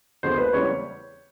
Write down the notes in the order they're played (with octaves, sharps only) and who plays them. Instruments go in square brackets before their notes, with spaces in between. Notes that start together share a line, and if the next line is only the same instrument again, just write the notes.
[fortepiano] D#2 D3 F3 G#3 B3 [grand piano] C5
[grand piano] B4
[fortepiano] E2 C#3 E3 G3 C4 [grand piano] C#5